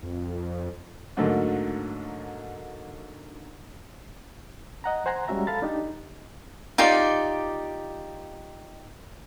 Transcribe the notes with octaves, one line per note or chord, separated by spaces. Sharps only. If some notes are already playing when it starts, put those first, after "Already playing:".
F2
G#2 D3 F#3 A3 A#3
D#5 F#5 A#5
C5 F#5 G#5 A#5 C6
G3 G#3 C#4 F#4 E5 A#5
A4 F5 A5 B5 A6
D4 D#4 G4
D#4 F4 G4 D5